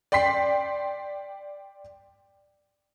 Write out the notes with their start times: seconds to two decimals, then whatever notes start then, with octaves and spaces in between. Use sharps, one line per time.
0.12 D5 G5 C6 B6 C7